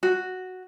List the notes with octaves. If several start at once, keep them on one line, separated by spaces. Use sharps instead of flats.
F#4